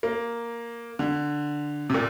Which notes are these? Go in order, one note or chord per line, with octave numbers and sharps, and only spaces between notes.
A#3
D3
C3
A#2